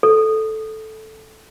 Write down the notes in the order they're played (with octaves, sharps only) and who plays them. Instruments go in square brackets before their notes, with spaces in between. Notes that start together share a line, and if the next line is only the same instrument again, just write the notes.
[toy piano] A4